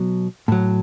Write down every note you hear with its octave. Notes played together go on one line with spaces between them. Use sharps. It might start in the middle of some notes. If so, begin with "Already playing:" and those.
Already playing: B2 F#3
A2 F#3